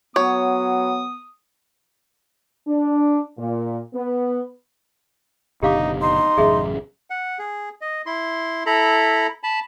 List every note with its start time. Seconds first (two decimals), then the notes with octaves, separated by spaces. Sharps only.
0.16 F#3 B3 C#5 D#6
2.68 D4
3.38 A#2
3.94 B3
5.63 F#1 B2 D3 D#4 G4 F5 D6
6.02 D#4 C6
6.37 A1 F#2 C#3 G#4 D#5 E5
7.10 F#5
7.39 G#4
7.81 D#5
8.06 E4 C6
8.66 E4 A4 A#5 B5
9.43 A5 B5